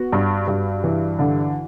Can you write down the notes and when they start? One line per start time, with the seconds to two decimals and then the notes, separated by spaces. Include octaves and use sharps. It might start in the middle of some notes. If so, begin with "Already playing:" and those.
Already playing: B3 F#4
0.12 G2
0.48 G2
0.84 E3
1.19 D3